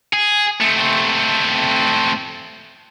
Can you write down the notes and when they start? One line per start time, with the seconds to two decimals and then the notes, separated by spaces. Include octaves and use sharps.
0.13 G#4
0.61 A3 C4